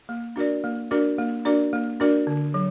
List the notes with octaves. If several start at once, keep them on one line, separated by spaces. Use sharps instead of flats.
A#3
D4 F#4 A#4 D5
A#3
D4 F#4 A#4 D5
A#3
D4 F#4 A#4 D5
A#3
D4 F#4 A#4 D5
D3
F#3